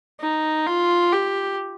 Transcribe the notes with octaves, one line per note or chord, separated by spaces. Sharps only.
D#4
F4
G4